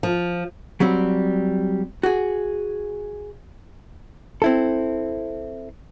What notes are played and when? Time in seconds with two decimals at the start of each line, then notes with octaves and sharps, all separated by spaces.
0.03 F3
0.80 F#3 G3 C4
2.03 F#4 G#4
4.42 C4 E4 A4